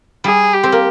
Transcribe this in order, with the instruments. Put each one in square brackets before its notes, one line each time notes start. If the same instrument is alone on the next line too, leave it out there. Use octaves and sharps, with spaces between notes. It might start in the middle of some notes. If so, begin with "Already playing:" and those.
[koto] G3 [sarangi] G#4
[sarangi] G4
[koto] C4
A#3